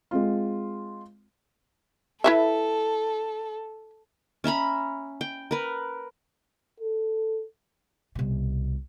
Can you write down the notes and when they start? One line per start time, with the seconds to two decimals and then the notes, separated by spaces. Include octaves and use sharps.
0.11 G#3 C4 F4
2.24 E4 A4 B4 E5
4.44 C#4 E5 A#5 B5
5.21 G5
5.51 A#4 B4
6.80 A4
8.15 C2 B2